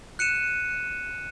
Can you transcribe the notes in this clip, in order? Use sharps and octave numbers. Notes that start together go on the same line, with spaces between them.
F#6 C#7 D#7 E7